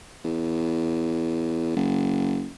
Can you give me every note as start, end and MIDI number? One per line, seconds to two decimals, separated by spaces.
0.24 1.72 40
1.76 2.49 30